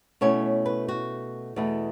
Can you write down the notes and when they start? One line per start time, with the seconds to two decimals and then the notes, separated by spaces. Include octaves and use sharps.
0.21 B2 A3 C#4 E4 C#5
0.66 B4
0.88 F#4
1.56 E2 B2 A3 E4